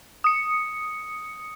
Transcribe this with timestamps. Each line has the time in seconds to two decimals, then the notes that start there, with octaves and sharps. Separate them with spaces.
0.24 D#6 C#7